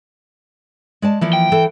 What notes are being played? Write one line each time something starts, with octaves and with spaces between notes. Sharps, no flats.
G#3 D5 A5
E3 F3 A#3
G5
E3 A4